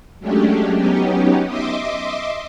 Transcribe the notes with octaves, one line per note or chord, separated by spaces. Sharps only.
F#3 G#3 A3 C#4 D4 G4
F#3 B3 C#4 D#4 G4
D#5 E5 C6 D6